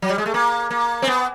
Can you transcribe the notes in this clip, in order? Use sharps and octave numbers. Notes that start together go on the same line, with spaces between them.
F#3
G3
G#3
A3
A#3
A#3
C4
B3